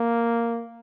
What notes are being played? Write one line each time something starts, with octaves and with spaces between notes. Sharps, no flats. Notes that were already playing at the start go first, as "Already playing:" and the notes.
Already playing: A#3